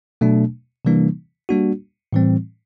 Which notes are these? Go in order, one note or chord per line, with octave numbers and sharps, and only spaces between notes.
B2 F#3 A3 D4
C3 E3 G3 A#3 D4
G3 A#3 D4 F#4
A2 E3 G3 C4